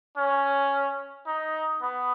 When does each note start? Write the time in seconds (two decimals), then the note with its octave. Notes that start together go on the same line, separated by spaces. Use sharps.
0.17 C#4
1.27 D#4
1.82 B3